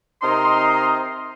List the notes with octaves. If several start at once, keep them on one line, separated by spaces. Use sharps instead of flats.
C3 C4 D#4 A#4 D#5 C6